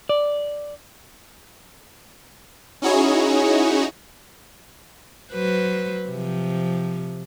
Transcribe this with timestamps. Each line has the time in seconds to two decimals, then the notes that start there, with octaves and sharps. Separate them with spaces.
0.09 D5
2.82 C#4 D#4 E4 F#4 G#4 C#5
5.32 F#3 B4 C5
6.09 C3 F3